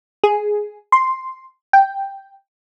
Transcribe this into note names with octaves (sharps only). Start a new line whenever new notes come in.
G#4
C6
G5